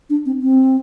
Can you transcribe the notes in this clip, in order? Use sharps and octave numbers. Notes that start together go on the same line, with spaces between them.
D4
C4
C4